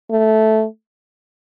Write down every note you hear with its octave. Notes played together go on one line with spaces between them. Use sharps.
A3